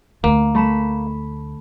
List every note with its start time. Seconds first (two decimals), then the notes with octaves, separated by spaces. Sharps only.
0.24 D2 A#3
0.55 A3 B5 E7